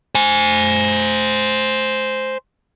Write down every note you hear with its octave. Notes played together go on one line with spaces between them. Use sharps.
C5 G#5